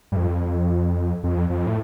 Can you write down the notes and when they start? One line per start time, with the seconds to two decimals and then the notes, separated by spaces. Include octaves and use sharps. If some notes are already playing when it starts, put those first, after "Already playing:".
0.12 G2
0.16 F2
1.24 F2
1.50 F2
1.67 A2